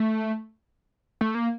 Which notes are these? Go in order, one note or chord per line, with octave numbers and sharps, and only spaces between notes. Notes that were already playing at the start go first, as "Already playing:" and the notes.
Already playing: A3
A3
A#3